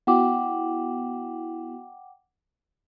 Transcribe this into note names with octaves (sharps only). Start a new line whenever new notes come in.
B3 E4 F#4 F#5 G5 D6